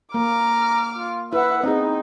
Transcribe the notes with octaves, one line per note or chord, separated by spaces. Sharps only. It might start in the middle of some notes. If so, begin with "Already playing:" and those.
A#3 A#5 D6 F6
F4
E4 B4 E5 F#5
B3 C4 D#4 G#4